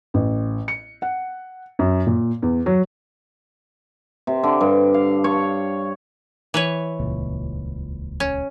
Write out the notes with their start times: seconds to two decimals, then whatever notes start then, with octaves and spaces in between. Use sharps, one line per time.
0.14 A1
0.68 C#7
1.02 F#5
1.79 F#2
2.07 A#2
2.42 E2
2.66 F#3
4.27 C3
4.44 D3
4.61 G2
4.94 F5
5.24 C#5
6.54 E3 B4 C#5
7.00 D#1 C#2 A#2
8.20 C#4